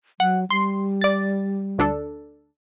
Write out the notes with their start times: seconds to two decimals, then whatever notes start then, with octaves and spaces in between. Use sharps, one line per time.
0.20 F#3 F#5
0.50 G3 C6
1.01 D5 A6
1.78 D2 D4 A4